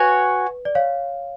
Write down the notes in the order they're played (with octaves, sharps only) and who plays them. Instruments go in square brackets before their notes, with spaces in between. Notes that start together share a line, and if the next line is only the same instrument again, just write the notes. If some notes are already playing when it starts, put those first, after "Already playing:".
Already playing: [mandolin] F#4 C#5 G#5 [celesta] B4
[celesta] D5
C#5 F5